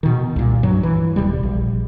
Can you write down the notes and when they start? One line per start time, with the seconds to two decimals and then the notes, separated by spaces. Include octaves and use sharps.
0.03 B2 D#3
0.36 C2 A#2
0.63 G2 F#3
0.83 E3
1.16 D#1 C#2 C3 G3
1.43 A#1